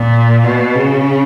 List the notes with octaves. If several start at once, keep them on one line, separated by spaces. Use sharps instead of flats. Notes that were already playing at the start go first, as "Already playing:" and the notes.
Already playing: A#2
B2
C#3